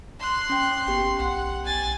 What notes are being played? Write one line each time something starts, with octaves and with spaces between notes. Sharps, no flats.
C6 F#6
C#4 G5
G1 B3 G4 G5
B1 F#5
G#5 A6